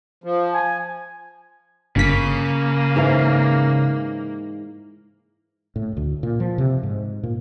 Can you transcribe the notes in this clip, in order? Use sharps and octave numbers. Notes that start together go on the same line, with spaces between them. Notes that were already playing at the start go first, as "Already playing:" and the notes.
F3
G#5
G1 C#3 A#3 B6
G#2 E3 F5
A2
D2
A#2
F3
C3
G#2
A#2